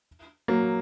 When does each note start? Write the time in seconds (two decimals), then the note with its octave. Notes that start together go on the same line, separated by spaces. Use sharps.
0.48 F#3 A#3